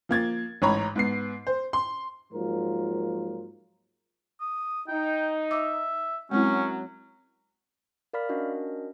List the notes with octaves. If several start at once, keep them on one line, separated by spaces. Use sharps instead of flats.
F3 A#3 G#6 A6
A1 G#2 C#5 A#5 B5
G#2 B3 C7
C5
C6
G#2 F3 F#3 A#3 F4 A#4
D#6
D#4 G5
E5 D6
F#2 F#3 G#3 C4 C#4 E4
A#4 D5 F5 B5 F6 B6
C#4 D4 F#4 A#4 D#5